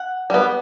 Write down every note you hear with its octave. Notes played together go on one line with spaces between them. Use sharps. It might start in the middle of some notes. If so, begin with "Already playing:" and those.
Already playing: F#5
G3 B3